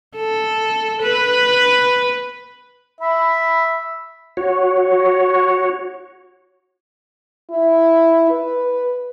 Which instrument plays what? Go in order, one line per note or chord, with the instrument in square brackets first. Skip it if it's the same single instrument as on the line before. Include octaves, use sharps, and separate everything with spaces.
[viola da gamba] A4
B4
[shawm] E5 [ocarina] B5
[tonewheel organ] F#4 C#5
[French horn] E4
B4